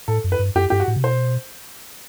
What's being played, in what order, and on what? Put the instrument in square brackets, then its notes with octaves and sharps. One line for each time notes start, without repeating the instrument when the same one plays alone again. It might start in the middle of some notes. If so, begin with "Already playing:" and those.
[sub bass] A2 [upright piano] A4
[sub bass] F#2
[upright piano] B4
[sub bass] G2
[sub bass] F#2 [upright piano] G4
[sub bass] G2 [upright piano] G4
[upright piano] F#4
[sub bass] A2
C3
[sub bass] B2 [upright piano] C5